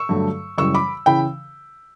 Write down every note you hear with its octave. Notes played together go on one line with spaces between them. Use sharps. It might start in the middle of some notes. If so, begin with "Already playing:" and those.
Already playing: C#6 E6
G2 D3 F#3 A3
F#2 C#3 E3 G3 C#6 E6
B5 D6
C#3 E3 G5 B5